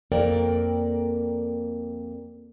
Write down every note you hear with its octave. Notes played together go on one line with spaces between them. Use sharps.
F2 A#3 A4 A#4 D5 G5